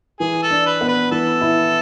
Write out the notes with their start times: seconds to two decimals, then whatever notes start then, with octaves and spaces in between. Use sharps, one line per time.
0.20 E3 G#4
0.43 A4
0.51 D4
0.66 B4
0.81 B3
0.88 B4
1.11 E3 A4
1.41 E4